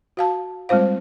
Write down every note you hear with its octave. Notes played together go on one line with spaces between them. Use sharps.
F#4 F5 A5
G3 G#3 C4 F4 C5 F5